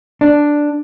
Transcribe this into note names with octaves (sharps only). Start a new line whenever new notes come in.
D4